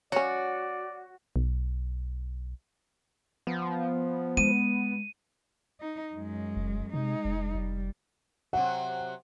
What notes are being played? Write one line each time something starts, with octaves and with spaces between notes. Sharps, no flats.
F#3 C#4 F#4 C#5 D5
B1
F3 B3
G#3 D#7
D#4
F#2 G#3
F1
C3 G#3 D#4
F1
F1 G3
C3 F#3 F#5